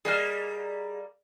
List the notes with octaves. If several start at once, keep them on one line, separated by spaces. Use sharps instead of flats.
G3 A#3 G#4 D#5 F6